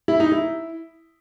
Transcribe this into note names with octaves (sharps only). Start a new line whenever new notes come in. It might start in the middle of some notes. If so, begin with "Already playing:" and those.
E4
D#4
E4